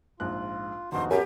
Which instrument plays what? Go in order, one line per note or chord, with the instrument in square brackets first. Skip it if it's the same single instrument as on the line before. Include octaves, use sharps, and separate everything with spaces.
[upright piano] A#1 G#2 F#6 [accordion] F4
[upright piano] D#1 A#1 [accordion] B3 D#4 F#4 [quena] C6
[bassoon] F#2 [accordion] F#3 B3 [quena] G4 [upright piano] G#5